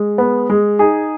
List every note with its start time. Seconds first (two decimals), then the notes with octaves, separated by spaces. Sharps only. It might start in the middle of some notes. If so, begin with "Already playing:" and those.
Already playing: G#3
0.18 B3
0.50 G#3
0.79 D#4 G#4